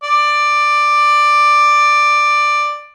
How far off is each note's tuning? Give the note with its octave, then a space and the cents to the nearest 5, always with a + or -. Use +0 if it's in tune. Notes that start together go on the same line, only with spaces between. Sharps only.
D5 +10